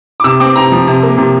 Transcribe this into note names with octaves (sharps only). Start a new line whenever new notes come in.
D6
C3 E6
C4 D6
C3 A#5
F3
C3
A#3
C3